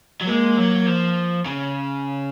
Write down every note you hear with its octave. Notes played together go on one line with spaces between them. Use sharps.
F#3
G#3 A#3
F#3
F3
C#3